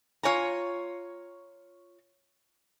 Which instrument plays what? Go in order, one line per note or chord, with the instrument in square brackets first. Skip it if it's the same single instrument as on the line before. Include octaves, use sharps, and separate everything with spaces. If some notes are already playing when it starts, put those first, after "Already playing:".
[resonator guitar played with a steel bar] F4 C#5 G#5 A#5